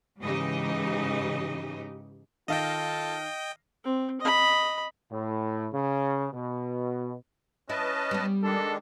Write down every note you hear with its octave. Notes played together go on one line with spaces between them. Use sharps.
G#2 C#3 E3 D#4 G4 D#5
D#3 F4 A4 D#5 F5 G5 A5 A#6
C4
D#5 B5
A2
C#3
B2
C#4 E4 B4 D#5 A5
G3 B3
D#3 G#3 D4 A4